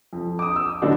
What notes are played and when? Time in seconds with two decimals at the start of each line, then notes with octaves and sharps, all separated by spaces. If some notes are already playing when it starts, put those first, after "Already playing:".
0.13 F2
0.39 D6 D#6
0.56 E6
0.82 A2 D3 F#3 B3 D4 D#4